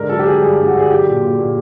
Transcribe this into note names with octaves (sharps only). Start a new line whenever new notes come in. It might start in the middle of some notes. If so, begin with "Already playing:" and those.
Already playing: G#2 D3 A#4
F#3 A4
G4
D3 G#4
G2 G#4
G2
F#4
D3 G#4
F#3 G4
A#2
A#2
A#2